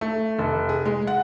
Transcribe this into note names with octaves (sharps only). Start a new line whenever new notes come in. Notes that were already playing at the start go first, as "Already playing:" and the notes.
A3
F1
G#4
G#3
F#5